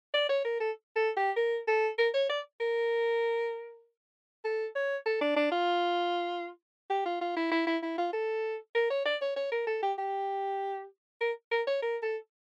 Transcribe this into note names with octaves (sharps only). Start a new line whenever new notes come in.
D5
C#5
A#4
A4
A4
G4
A#4
A4
A#4
C#5
D5
A#4
A4
C#5
A4
D4
D4
F4
G4
F4
F4
E4
E4
E4
E4
F4
A4
A#4
C#5
D5
C#5
C#5
A#4
A4
G4
G4
A#4
A#4
C#5
A#4
A4